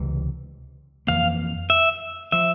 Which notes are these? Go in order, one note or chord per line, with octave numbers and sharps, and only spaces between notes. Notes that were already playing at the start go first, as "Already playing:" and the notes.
Already playing: C#2 C3 E3 G#3
F2 E3 A#3 F5
E5
F3 E5